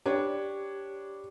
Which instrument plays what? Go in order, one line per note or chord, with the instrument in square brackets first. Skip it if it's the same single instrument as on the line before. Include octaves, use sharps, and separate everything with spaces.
[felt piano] D4 B4 C#5 [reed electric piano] G4